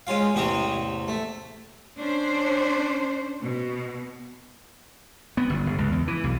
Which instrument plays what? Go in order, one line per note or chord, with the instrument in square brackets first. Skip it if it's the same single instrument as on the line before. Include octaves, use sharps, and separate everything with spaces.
[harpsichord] G#3 C#4 F4 F5
A1 E2 C3 C4 C#6 D#6
A3
[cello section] C#4 D4 C5
B2
[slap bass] B3
G1
G1
C#2
E2
E3
B1